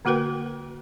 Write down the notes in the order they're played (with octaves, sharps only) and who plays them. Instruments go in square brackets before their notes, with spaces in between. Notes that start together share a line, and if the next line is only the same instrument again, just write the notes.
[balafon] D3 A#3 F#4 A#4 B4 G5